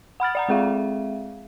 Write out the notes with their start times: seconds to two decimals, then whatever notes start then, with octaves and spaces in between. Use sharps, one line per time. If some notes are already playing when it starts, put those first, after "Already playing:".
0.20 F#5 B5 F6 A6
0.35 D5 F#5 A#5
0.48 G#3 C4 G#4 E5 F5